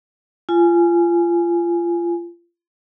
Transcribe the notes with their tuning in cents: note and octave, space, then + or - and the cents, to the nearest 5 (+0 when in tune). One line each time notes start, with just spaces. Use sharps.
F4 -25 G#5 +5